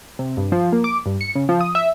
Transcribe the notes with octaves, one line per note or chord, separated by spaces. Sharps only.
C3
G2
F3
A#3
D6
G2
C#7
C#3
F3
D#6
E5